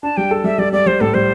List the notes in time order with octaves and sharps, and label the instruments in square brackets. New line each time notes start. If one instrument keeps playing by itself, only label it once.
[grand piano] D4 [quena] A5
[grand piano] G3 [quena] G5
[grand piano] A4
[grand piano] G3 [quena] E5
[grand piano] G3 [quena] D5
[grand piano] G3 [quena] D5
[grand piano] G3 [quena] C5
[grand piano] A2 [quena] A4
[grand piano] G3 [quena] C5